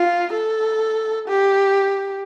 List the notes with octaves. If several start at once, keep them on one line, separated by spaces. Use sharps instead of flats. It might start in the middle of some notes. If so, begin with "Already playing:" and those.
Already playing: F4
A4
G4